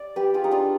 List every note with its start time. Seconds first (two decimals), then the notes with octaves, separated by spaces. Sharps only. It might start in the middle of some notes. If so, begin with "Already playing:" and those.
Already playing: D5
0.16 G4 B4
0.34 F4 G#4
0.44 D#4
0.51 D4 F4